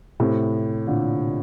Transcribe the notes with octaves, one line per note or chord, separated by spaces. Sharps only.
A2 C3
A#2 D3